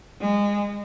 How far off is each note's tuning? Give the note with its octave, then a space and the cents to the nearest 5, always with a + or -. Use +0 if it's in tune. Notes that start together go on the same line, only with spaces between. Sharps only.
G#3 -25